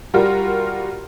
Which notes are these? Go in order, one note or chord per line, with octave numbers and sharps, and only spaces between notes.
G3 F4 F#4 A#4